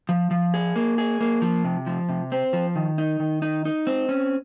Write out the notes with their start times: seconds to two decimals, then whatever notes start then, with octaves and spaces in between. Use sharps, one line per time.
0.09 F3
0.31 F3
0.54 G#4
0.76 A#3
0.98 G#4
1.21 A#3
1.42 F3
1.64 C3
1.86 F3
2.09 C3
2.32 C4
2.53 F3
2.76 D#3
2.98 D#4
3.20 D#3
3.42 D#4
3.65 D#4
3.87 C4
4.09 C#4